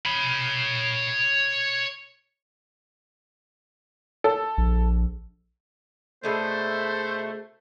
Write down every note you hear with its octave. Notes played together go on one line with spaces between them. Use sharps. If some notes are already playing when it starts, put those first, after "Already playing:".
C#5 B5
A4
A#1
B2 G#3 A3 D4 C5